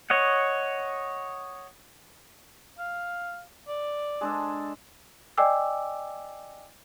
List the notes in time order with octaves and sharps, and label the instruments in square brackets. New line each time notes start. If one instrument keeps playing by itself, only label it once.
[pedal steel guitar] C#5 D#5 F#5
[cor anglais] F5
D5
[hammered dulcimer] G#3 D4 A4
[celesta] D5 D#5 G5 G#5 D6 E6